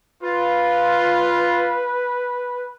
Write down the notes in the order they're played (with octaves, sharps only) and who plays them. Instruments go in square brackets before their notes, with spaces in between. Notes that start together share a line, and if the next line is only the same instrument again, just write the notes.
[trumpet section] F4 [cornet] B4